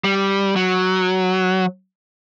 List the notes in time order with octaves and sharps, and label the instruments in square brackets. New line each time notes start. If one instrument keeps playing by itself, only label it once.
[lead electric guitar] G3
F#3